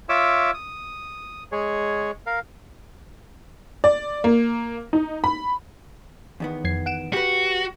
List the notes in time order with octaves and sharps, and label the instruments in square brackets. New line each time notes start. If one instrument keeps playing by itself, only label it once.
[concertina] F4 C#5 E5 D6 E6
D#6
G#3 G#4 C#5
A#4 F5
[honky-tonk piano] D5
A#3
D#4
B5
[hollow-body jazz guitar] E2 D#3 B3
[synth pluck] F2 G#6 C7
F#5 D7 E7
[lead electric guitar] F#4 [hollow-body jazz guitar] G4 B4